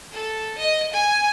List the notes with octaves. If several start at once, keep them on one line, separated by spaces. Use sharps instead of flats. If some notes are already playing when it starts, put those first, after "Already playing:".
A4
D#5
G#5